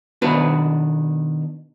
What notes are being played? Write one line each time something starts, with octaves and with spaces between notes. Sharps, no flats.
B2 D#3 B3 D4 F#4 B4